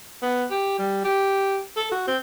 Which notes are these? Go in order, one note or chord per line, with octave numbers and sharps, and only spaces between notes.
B3
G4
G3
G4
A4
F#4
C4